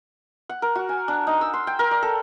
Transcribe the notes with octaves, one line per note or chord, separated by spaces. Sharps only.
F#5
A#4
F#4
G#5
D4
D#4
E6
C6
G5
A#4
D5
A4